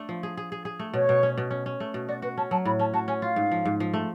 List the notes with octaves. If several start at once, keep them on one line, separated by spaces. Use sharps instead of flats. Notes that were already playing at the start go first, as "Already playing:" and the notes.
Already playing: A3 D4
F3
G#4
G#4
G#4
G#4
A3
B2 C#5
B2
C#4
B2
C#4
C#4
A3
B2
F#4 D5
F#4 B4
C#4 A5
F#3 A5
A2 B5
C#4 A5
F#4 A5
C#4 G#5
F4 F5
G#2
F3
G#2
F3
A3